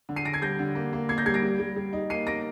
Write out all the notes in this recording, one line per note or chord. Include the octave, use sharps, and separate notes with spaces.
D3
C7 D#7
D3 A#6 D7
G#6 C7
G3 G6 A#6
D3
A#3
A#3
A#3 G#6 C7
G6 A#6
G3 G#6 C7
A#6 D7
G3
G3
G3
D#4
A#3 C7 D#7
A#3 A#6 D7